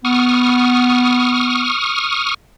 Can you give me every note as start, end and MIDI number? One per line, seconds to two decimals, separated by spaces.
0.05 1.68 59
0.05 2.34 85
0.05 2.34 87
0.05 2.34 89